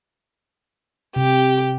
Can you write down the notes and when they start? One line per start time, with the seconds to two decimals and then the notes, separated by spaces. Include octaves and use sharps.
1.16 C3 G4